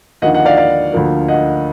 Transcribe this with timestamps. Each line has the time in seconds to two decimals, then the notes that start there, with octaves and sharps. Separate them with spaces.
0.22 D#2 D3 F3 D#5 F#5
0.34 D#5 F#5
0.46 D5 F5
0.57 D5 F5
0.93 D2 D3 F3 A#3
1.28 D#5 F#5